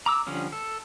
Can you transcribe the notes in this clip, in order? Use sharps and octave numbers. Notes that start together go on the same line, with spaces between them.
A#5 D6 E6
D3 F3 G3 C#4
A4